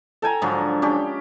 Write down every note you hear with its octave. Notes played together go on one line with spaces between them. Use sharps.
A4 G5 G#5 A#5
G#2 D3 F3 F#3
C#4 D4 G4